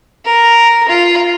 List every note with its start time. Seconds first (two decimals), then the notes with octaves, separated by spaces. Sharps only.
0.25 A#4
0.89 F4